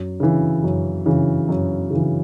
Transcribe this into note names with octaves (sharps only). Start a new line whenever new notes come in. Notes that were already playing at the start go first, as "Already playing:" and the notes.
Already playing: F#2
C#3 E3
F#2
C#3 E3
F#2
C#3 E3